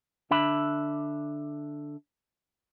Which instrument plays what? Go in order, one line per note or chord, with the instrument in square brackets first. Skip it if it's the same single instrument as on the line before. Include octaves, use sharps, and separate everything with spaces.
[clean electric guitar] D3 D4 E5 B5